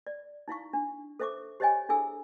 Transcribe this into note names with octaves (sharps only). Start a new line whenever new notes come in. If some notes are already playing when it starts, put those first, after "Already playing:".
D5
D#4 E4 F5 C#6
D4
A4 C5 E5 C#6 D6
G4 C5 C#5 D#5 G5 G#5
D4 E4 G#4 A4 G#5 E6